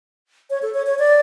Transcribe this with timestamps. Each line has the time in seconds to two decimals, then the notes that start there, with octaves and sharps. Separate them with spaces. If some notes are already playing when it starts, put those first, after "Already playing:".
0.50 C#5
0.62 A4
0.74 C#5
0.86 C#5
0.99 D5